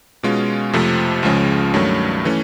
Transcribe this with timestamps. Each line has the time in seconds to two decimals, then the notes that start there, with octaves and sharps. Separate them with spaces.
0.23 B2 G#3 C#4 F4
0.73 F2 C3 F3 A3
1.23 C#2 C#3 F3 G#3 C#4
1.74 G2 D#3 F#3 A3 C#4
2.25 E3 A3 C#4